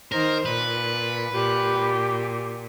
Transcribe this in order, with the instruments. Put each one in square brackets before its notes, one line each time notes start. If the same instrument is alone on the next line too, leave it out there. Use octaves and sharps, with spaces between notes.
[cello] D#3 C5 [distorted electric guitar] A#4
[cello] A#2 [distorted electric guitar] B4
[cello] A#2 [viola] G4